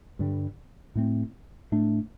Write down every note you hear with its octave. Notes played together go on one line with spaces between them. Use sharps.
G2 D3 G3
A2 A3 C4
A2 A3 D4